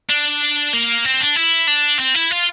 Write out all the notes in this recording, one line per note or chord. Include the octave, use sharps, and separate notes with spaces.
D4
A#3
C4
D4
E4
D4
C4
E4
F4